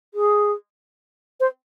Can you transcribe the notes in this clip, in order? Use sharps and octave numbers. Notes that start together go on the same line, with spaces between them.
G#4
C5